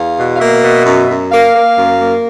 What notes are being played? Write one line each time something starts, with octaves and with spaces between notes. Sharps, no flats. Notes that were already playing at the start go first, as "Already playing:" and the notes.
Already playing: E2 F5
B2
F5
A#3 E5
B2
F#2
F#2
A#3 F5
A#3
F#2
A#3